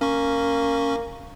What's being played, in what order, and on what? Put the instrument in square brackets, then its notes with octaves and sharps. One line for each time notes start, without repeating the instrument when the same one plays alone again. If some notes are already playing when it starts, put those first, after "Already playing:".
[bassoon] A#3 [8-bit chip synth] C#4 C#6